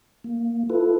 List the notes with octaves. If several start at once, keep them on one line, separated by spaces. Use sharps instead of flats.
A#3
E4 F4 A4 B4